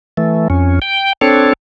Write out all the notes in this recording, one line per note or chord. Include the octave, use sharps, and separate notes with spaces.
E3 A3
F2 C#4
G5
C4 D4 A4 C#5